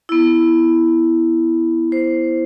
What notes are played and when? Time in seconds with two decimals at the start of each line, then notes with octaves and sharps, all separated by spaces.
0.09 B3 E4
1.92 C5